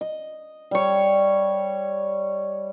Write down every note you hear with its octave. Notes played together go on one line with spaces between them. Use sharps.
D#5
G3 C#5